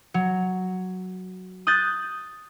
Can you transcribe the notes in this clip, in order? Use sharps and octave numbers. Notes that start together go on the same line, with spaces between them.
F#3
D#6 F#6 G6 A6